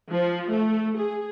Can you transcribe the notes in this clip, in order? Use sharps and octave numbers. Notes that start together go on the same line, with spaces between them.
F3
A3
G#4